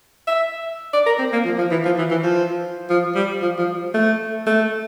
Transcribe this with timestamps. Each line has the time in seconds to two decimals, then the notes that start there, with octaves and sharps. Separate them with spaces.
0.27 E5
0.93 D5
1.06 A#4
1.19 C4
1.32 A#3
1.45 F3
1.58 F3
1.71 E3
1.85 F3
1.98 E3
2.11 E3
2.24 F3
2.90 F3
3.15 G3
3.42 F3
3.59 F3
3.94 A3
4.46 A3